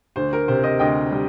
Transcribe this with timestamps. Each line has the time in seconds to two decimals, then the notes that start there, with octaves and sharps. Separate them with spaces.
0.16 D2 C5
0.33 A#4
0.48 C3 C5
0.63 C5 D#5
0.79 D2 D#5 G5
1.11 G3